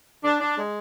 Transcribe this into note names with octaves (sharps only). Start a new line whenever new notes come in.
D4
D4
G#3